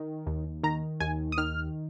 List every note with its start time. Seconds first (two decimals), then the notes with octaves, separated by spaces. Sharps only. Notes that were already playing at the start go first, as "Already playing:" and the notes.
Already playing: D#3
0.27 D#2
0.63 D#3 A#5
1.00 D#2 G#5
1.32 D#6
1.38 D#3 F6